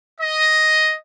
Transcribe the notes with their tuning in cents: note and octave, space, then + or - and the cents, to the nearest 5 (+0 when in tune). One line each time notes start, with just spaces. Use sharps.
D#5 +5